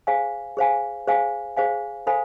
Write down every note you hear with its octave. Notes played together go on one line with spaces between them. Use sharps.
G#4 C5 F5 G#5
G#4 C5 F5 G#5
G#4 C5 F5 G#5
G#4 C5 F5 G#5
A4 C5 F5 G#5 B5